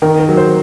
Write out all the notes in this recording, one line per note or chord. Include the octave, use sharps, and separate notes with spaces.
D#3 A#4
A#4
F#3
C5